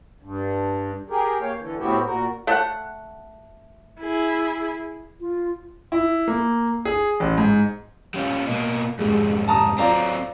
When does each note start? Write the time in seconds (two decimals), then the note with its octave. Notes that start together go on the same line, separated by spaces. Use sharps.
0.22 G2
1.10 G4 G#4 A#4
1.41 A#3 C#5 F5 G5
1.58 D3 E3
1.78 A2 B3 C4 E4 F#4 G4
2.06 A#2 F#4 A#4
2.47 A3 F#5
4.01 E4 G#4
5.21 F4
5.92 E4
6.28 A#3
6.85 G#4
7.20 A1
7.38 G#2
8.14 G3 C#4 F4
8.46 B2 A#3
8.99 F2 G#2 G3 G#3
9.48 A5 A#5 D#6
9.78 F#3 C4 F4 D5 A#5